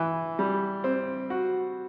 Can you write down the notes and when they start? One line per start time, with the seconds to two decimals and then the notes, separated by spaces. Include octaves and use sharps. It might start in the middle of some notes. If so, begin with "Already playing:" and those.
Already playing: E3
0.39 G3
0.84 C4
1.30 F#4